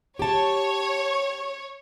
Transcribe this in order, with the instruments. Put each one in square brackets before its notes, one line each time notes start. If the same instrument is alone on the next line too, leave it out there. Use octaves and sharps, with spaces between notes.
[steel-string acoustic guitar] G4 A5 [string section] C#5